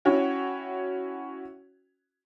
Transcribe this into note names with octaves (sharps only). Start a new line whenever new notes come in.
C#4 E4 F#4 C#5 G5